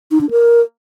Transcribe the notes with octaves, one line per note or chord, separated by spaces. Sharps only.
D#4
D4
A#4